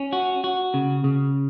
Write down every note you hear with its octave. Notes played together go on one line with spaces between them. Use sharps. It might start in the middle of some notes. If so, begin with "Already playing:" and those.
Already playing: C#4
F#4
F#4
C#3
C#3